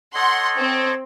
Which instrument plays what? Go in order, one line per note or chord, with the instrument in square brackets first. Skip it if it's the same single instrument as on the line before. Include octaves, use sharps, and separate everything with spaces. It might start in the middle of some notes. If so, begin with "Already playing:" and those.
[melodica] A4 C#5 D#5 [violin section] F#5 C6
[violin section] C4